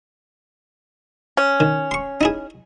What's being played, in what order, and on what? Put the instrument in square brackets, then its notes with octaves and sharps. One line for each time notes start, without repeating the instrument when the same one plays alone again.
[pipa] C#4
[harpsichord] D#3
C6 C#6
D#4 E4 G#4